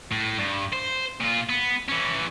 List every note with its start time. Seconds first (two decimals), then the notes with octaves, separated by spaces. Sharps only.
0.12 A2
0.38 G2
0.73 C5
1.21 A#2 F4
1.49 B3
1.88 E3 C#4